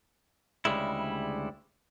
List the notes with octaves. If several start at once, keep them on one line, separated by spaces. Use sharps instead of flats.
D2 C#3 E3 G3 G#3 E4